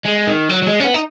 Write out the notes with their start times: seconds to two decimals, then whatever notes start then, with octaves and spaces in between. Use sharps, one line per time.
0.05 G#3
0.27 D#3
0.49 F#3
0.62 F#3
0.66 G#3
0.80 C#4
0.84 B3
0.94 D#4